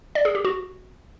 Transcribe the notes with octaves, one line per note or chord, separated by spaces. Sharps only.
D5
G#4
G4
F#4